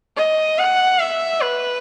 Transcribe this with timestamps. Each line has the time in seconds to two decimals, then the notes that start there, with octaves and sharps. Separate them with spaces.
0.17 D#5
0.58 F#5
0.99 E5
1.41 B4